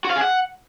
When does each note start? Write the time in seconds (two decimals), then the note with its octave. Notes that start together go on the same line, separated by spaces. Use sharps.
0.05 F#4
0.10 F5
0.16 G#4
0.21 F#5